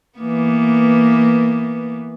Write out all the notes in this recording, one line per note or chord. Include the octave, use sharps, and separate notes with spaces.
E3 A#3 B3